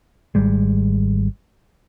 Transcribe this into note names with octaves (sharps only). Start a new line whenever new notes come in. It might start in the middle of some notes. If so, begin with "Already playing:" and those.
G#1 G3 G#3